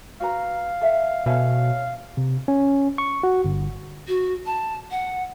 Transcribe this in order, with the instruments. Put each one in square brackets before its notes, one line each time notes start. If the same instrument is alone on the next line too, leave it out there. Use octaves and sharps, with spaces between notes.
[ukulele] F#4 B4 A#5 [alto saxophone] F5
[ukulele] A4 E5 F#5
[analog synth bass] B2 [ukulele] C#4 A4 E5 [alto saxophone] F5
[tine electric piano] C3
C#4
C#6
F#4
G1
[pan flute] F#4
A5
F#5